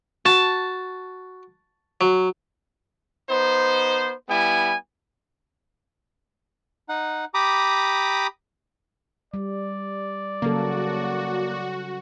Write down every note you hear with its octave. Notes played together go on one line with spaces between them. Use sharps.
F#4 A5
F#3
B3 D#4 C5
G3 B3 E4 G#5
D#4 F#5
G4 A#5 B5 D6 D#6
G3 D5
C#3 F#3 A#3 F#4 A4